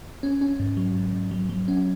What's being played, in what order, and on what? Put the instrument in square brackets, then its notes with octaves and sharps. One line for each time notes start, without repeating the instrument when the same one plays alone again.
[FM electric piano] C#4
C#4
G#2
F#3
G#2
G#2
F#3
F#3
C#4